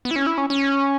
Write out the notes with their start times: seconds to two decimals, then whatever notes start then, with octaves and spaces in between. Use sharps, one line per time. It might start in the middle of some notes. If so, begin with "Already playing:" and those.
0.05 B3
0.11 E4
0.16 C#4
0.27 E4
0.38 C#4
0.50 C#4